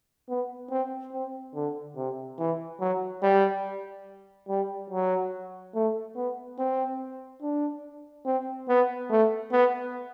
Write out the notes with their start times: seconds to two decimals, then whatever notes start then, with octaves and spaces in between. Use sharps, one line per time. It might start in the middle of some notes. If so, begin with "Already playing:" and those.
0.29 B3
0.70 C4
1.13 C4
1.54 D3
1.96 C3
2.38 E3
2.80 F#3
3.22 G3
4.49 G3
4.90 F#3
5.75 A3
6.16 B3
6.59 C4
7.42 D4
8.25 C4
8.68 B3
9.10 A3
9.52 B3